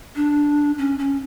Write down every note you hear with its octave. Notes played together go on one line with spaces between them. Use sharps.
D4
C#4
C#4